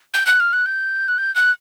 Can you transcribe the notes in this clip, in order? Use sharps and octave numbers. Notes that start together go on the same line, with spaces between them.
G6
F#6
F6
F#6
G6
F#6
G6
F#6